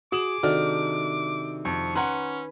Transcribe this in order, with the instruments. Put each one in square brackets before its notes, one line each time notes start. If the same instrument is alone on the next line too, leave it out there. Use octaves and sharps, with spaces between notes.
[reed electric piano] F#4 [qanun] G#4 [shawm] D6 [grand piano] D#6 E7 F#7
[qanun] C3 D#3 D4 [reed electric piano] F#4 A4 D5 [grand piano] F6
[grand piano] F2 [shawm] C#6
[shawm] C#4 [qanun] B4 G#5 [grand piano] F#5 A#5 C6